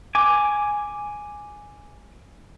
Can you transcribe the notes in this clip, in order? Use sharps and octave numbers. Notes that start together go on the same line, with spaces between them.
G#5 D6